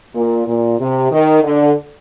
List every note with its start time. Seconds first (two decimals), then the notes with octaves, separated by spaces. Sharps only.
0.14 A#2
0.46 A#2
0.79 C3
1.12 D#3
1.43 D3